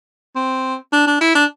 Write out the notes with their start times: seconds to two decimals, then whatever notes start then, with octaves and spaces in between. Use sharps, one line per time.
0.36 C4
0.93 D4
1.07 D4
1.21 E4
1.35 D4